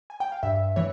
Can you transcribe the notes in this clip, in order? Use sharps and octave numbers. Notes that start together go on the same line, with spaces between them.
G#5
G5
F5
G2 E5
E3 C#5